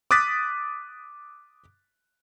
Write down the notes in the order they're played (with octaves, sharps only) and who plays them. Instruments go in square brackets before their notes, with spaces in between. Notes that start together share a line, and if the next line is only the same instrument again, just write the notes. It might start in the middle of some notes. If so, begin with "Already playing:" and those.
[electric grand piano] D6 D#6 F#6 A6 B6